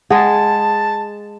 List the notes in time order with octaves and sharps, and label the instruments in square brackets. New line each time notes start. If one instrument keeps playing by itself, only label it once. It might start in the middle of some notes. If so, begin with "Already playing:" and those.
[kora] G#3 G#4 [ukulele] F#5 [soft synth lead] A5